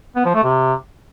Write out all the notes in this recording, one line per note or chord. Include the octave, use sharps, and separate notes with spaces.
B3
F3
A3
C3